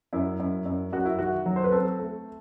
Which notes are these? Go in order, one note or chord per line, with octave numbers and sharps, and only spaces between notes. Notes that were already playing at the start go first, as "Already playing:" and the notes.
F#2 E4
F#2
F#2
F#2 F#4
E4
D#3 F#4
F#3
C5
B4
C4 A4
A3